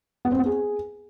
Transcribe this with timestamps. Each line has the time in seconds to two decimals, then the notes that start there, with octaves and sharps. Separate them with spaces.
0.25 B3
0.32 C4
0.39 B3
0.46 G#4